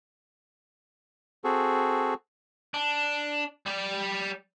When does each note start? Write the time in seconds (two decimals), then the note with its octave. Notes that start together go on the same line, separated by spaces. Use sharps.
1.44 C4 F#4 G#4 A4
2.74 D4
3.66 G3 D5